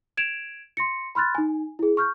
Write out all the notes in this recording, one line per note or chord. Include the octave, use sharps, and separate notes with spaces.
G#6 D7 E7 F7
C6 A#6 C#7
B5 C6 F6 F#6 A6
D#4 G#5
E4 G#4
C#6 F6 G6